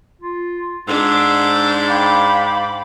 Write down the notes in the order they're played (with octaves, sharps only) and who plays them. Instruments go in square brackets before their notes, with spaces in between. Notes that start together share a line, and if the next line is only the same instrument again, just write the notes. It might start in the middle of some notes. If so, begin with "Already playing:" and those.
[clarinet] F4
[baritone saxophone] G#2 [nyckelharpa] D4 D5 [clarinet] E6
[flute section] F5 B5 D6 [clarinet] G5